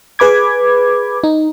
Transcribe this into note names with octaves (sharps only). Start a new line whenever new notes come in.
G#4 B4 B5 D6 G#6
D#4